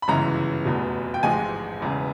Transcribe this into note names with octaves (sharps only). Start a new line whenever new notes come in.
B5
G1 F#2 C#3 E3 G#3 A#5
F1 E2 B2
G5
A1 G#2 F3 G#3 G#5
E1 E2 C#3